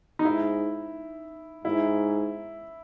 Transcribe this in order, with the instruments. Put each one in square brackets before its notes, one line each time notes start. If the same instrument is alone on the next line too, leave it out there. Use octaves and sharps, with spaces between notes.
[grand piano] D#4
[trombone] G#2 [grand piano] E4
[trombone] G#2 [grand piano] E4